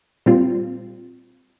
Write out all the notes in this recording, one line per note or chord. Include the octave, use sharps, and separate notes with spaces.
A#2 G3 C4 F4